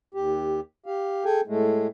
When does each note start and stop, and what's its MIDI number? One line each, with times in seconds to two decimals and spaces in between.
0.14 0.60 39
0.14 0.60 67
0.86 1.24 67
0.86 1.24 77
1.25 1.41 68
1.25 1.41 69
1.25 1.41 79
1.25 1.41 80
1.47 1.87 45
1.47 1.87 56
1.47 1.87 57